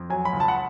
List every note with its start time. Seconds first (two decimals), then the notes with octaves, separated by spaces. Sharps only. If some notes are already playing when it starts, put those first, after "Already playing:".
Already playing: F2
0.10 F#3 G#5
0.25 B5
0.33 C#2
0.40 A5
0.48 F#5